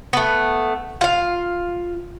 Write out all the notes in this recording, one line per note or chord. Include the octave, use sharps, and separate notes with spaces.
A3 B3
F4 F5